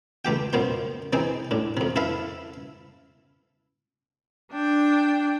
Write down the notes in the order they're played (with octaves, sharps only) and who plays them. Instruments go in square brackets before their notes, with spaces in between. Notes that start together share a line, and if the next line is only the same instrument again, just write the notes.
[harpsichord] C#2 A3 G4 G5
F#2 B2 F3 C5 C6
C3 E3 C4 D#4 G#4
A2 D4
F2 C3
E4 A4 B4 E5 F5
[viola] D4 G5